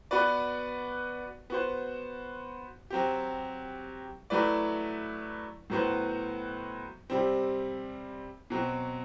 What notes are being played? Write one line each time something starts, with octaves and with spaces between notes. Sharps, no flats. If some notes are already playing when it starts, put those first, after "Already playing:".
B3 F#4 B4 D5
B3 F#4 C5
F#3 C4 G4
F#3 A3 E4 B4 D5
A2 F#3 B3 F#4 C5
C3 G3 C4
B2 F#3 C4